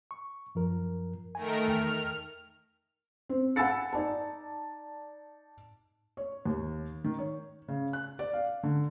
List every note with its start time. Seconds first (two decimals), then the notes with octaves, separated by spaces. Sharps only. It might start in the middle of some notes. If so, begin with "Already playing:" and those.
0.11 C#6
0.55 F#2 F3 A#4
1.35 D#3 A3 A#4 G#5
1.68 E2 G5 F6
3.29 C4
3.56 F#5 G#5 B5 E6 A6 C#7
3.93 D#4 D5 A5
6.17 C#5
6.45 D#2
7.04 D#3
7.19 C#5
7.68 C#3
7.93 F#6
8.19 D5
8.33 F5
8.63 D3